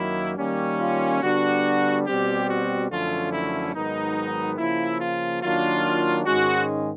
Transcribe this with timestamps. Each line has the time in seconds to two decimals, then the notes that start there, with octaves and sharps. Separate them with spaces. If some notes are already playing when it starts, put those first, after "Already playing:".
Already playing: F#2 D#3 F#3 A#3 E4
0.37 D#3 G3 A#3 C#4
0.80 F4
1.22 D3 G3 B3 D4 F#4
2.06 B2 G3 C4 G4
2.48 F#4
2.90 F#2 D3 F3 A3 C#4 F4
3.32 E4
3.74 G#2 D#3 F#3 B3 D#4
4.58 C#3 F3 A#3 E4
5.01 F4
5.42 D#3 F#3 A#3 D4 F4
6.26 G#2 D#3 G#3 C#4 F#4